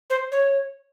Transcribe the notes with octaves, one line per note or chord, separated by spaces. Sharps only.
C5
C#5